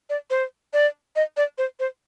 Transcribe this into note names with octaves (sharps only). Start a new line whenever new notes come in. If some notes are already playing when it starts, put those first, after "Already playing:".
D5
C5
D5
D#5
D5
C5
C5